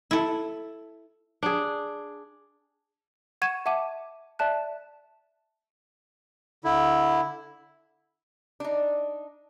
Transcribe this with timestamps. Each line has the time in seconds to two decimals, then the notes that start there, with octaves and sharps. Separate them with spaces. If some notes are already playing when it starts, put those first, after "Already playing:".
0.11 E4 A4
1.43 D4 G#4
3.42 F#5 C#6 G#6 D#7 E7
3.66 E5 F#5 A5 D6 D#7
4.39 D5 E5 A5 F#6
6.64 D3 E4
8.60 D4 D#4